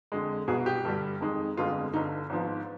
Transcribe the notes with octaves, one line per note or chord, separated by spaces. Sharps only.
F2 D3 G#3
C2 B2 B3 G#4
G4
G2 D3 G3
F2 D#3 G#3
G1 F2 D3 G#3 B3 F4
G1 G2 D3 D#4
G#1 G#2 F3 B3